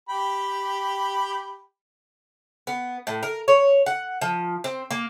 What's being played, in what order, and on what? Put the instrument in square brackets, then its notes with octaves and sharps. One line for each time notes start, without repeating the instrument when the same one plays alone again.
[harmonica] G4 G5 B5
[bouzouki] B3
A2
A#4
C#5
F#5
F3
C4
A#3